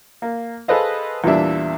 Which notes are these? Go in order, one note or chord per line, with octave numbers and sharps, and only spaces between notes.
A#3
G#4 A4 B4 C5 D#5 F5
E2 A#2 E3 G3 D4 E5